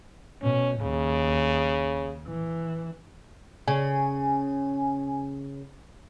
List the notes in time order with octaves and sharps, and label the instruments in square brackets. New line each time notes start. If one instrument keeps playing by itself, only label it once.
[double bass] B2 [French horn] C#4
[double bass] D#2 [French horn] C#3
[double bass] E3
[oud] C#3 [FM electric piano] G#5